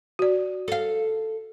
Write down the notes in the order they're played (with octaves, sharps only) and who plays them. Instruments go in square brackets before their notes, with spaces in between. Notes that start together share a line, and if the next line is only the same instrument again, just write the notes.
[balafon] F#4 D5
[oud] A4 F5